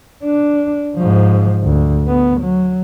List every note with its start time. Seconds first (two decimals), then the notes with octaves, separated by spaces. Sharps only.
0.24 D4
0.97 G#2 F3
1.63 D2
2.08 B3
2.41 F#3